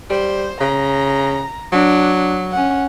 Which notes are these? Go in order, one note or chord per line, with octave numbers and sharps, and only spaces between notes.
G3 C5
C#3 A#5
F#3 D4
C#4 F#5